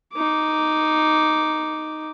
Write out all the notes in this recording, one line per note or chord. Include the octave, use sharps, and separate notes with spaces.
D#4 D6